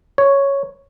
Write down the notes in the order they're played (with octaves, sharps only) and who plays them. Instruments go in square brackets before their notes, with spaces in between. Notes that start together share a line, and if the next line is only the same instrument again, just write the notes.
[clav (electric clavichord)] C#5